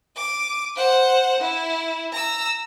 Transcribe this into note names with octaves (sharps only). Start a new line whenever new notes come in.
D6 D#7
C5 F#5
E4
A#5 E6